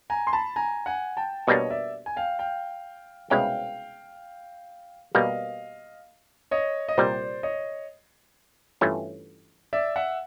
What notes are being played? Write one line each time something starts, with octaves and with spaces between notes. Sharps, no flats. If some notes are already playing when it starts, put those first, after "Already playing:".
G#5 A#5
C6
A5 B5
G#5 A#5
F#5 G#5
G5 A5
B2 G3 A#3 D4 C#5 D#5
D5 E5
G#5
F5 G5
F5 G5
C2 B2 G#3 C#4 E4 F5 G5
B2 G3 A#3 D#5 F5
C#5 D#5
D#5
C2 A#2 G3 C5 D5
C#5 D#5
G2 E3 A3 C#4 F4
D5 E5
E5 F#5